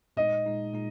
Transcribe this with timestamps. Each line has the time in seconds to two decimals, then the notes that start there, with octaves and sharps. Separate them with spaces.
0.17 A#2 G#3 D#4 D#5
0.46 A#2 G#3 D#4
0.73 A#2 G#3 D#4